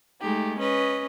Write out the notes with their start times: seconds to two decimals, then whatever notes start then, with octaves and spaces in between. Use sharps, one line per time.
0.21 G#3 A3 D#4 G4
0.59 C#4 B4 D#5